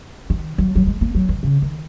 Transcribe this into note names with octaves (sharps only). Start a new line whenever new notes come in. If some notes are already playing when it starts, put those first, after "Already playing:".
D#3
F#3
F#3
G#3
A#3
F#3
D#3
C#3
D#3